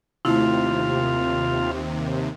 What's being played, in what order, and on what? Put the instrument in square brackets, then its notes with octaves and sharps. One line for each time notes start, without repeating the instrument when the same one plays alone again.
[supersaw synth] D#2 C3 [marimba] A3 E4 [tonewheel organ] F4